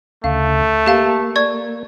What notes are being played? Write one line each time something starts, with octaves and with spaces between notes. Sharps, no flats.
D2 C#3 A3 F5
A#3 G4 F5 A5
D5 C#6 G#6